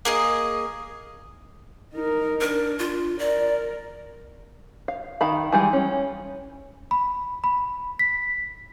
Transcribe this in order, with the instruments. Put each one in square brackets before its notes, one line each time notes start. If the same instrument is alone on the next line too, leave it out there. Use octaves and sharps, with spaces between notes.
[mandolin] A#3 G#4 D#5
[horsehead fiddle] D#4 A#4
[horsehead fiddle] D4 [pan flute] A#4
[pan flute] F4
[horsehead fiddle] A#4 [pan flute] D5
[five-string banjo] F5
D#3 F5 B5
E3 G3 G#3
C#4
[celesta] B5
B5
B6